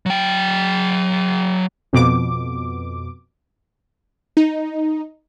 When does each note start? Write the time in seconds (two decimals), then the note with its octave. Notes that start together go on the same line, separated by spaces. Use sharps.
0.06 F#3 G5
1.93 F2 B2 D6
4.37 D#4